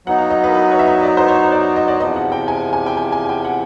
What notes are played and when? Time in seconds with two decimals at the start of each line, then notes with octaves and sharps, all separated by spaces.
0.06 F#3 B3 D#4 F#5
0.18 F5
0.30 D#5
0.44 B4
0.49 A#4
0.55 B4
0.72 C#5
0.79 E5
0.87 D#5
1.03 D5
1.17 C5
1.28 C#5
1.52 D5
1.76 D#5
1.88 D5
2.00 E2 C3 F3 D#5
2.16 F#5
2.32 G5
2.48 G#5
2.73 G#5
2.86 G5
2.97 G#5
3.12 G#5
3.29 G5
3.45 F#5